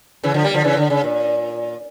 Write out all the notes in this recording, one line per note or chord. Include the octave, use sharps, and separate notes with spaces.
C#3 E3
D3 F3
G3 A#3
D3 F3
C#3 E3
D3
C#3
A#2